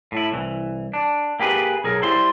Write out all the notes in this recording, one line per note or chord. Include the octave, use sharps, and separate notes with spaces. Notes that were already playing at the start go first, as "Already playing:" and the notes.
A2 E4
C2 E3
D4
A#3 G4 G#4 B4
B1 G#4 A#4
G3 E4 C5 C6